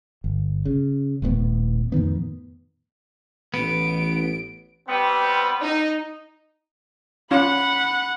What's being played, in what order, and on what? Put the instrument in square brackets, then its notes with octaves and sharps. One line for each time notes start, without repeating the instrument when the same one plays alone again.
[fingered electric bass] G1
C#3
D#1 A2 A3 B3
F2 A2 D#3 B3
[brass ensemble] A1 [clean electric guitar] B3 [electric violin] D7
[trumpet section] G3 C4 [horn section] B3
[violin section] D#4
[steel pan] C#4 F4 [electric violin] F#5 [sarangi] B5